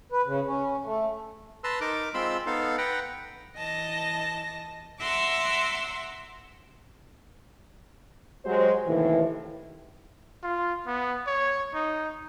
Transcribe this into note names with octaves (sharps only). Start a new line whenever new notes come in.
B4
C#3
C#4
A3
B4 A5 A#5 C6 E6
D#4 A#4 D6
G#3 C4 F4 B5 C6 E6
B3 D#4 A4 F5
B4 F#5 G5 A#5
E3 D#5 A5 A#6
E5 F#5 A#5 C6 D6 E6
F#3 G#3 F#4 G4 C5
D#2 A2 C3 D#3 E3
F4
B3
C#5
D#4